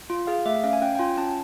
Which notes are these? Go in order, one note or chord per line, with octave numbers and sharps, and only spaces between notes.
F4
G#4 F5
A3 E5
C#4 F5
G#5
C#4 G5
G5
F4 G#5
C#4 A5